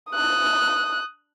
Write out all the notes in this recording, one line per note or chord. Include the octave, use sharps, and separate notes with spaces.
D#6 F#6